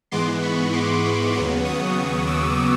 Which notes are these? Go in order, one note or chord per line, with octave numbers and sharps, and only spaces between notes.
G#2 E3 G#3 B3 C6 D6
B5 C#6
C6 D6
D#2 C#3 F#3 B3
C#6 D#6
D6 E6